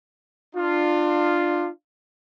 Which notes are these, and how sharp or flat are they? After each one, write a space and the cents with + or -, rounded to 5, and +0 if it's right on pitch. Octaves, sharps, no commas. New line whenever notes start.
D4 +25 F4 +0